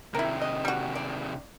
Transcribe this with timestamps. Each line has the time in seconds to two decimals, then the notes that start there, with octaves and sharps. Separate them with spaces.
0.14 C3 D#3 E4 A#4
0.41 D#5
0.65 G3 F#4
0.95 D5